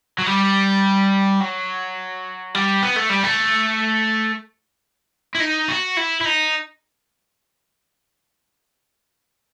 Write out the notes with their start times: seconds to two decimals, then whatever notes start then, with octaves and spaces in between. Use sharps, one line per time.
0.19 F#3
0.26 G3
1.40 F#3
2.55 G3
2.83 B3
2.96 A3
3.10 G3
3.24 A3
5.35 E4
5.40 D#4
5.68 F#4
5.97 E4
6.21 E4
6.25 D#4